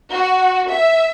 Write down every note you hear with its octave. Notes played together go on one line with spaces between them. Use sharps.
F#4
E5